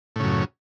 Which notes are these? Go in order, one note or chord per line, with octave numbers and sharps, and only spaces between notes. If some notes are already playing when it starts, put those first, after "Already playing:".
F#2 A2 C#3